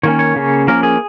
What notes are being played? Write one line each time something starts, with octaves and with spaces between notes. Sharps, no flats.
D#3 A#3 C#4 C#5
C#5
C#3 A#3 C#4
F3 A#3 C#4 A#4
G#4